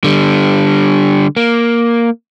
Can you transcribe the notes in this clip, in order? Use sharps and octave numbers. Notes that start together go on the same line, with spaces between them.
D3 G3
A#3